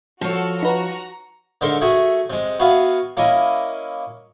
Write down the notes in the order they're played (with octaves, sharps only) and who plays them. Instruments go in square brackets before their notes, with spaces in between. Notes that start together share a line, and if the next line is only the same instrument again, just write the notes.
[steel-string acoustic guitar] F3 C#5 [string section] F#4 A4
[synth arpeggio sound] D#4 B4 [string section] F#4 A#5
[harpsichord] G#2 D3 A4 A#4 E5 C6
A3 F#4 G#4 E5 G#5
C3 G#3
B3 F#4 G#4 E5 F5
A#3 C#4 E4 D#5